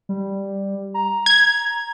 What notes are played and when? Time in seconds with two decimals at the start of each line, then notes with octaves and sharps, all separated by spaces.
0.09 G3
0.94 A#5
1.26 G#6